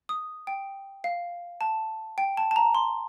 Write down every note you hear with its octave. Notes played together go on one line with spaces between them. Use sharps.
D#6
G5
F5
A5
G5
A5
A5
A#5
C6